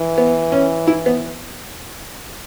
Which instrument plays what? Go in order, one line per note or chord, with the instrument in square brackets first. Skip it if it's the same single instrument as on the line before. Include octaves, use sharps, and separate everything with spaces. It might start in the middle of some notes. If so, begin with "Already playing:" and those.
Already playing: [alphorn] E3
[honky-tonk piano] B3
C#4
E4
B3